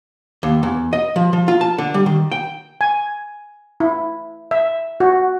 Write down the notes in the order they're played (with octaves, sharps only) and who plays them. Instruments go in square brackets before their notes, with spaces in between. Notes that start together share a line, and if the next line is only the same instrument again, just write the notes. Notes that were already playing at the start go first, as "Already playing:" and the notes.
[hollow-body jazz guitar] D#2
E2
D#5
F3
F3
F4
A5
D3
G3
D#3
G5
[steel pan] G#5
E4
E5
F#4